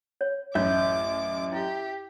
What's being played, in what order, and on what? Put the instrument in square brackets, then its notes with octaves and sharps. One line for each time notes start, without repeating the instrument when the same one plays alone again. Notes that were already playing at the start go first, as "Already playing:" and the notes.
[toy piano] C#5
[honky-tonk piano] A1 F#2 [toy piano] F4 [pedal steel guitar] E5 G6 [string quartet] D6
[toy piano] E4 [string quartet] G4